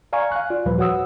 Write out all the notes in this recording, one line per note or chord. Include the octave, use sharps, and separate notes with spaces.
D5 F5 G#5 A#5 C#6
F5 F#6
F4 D5
D#2 A#2 F3 G3 B4 C5
F#4 C#5 F#5 D#6 E6